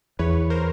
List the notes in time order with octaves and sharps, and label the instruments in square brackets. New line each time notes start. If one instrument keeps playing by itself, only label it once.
[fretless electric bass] E2 [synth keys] B4 C#5
[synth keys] A#4 C5